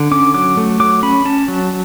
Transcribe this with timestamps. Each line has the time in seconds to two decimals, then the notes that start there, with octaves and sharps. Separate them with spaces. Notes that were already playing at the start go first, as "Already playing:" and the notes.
Already playing: D3
0.11 C#4 D6
0.34 F#3 D6
0.57 A3
0.80 F#3 D6
1.03 C#4 B5
1.25 C#4 A5
1.48 F#3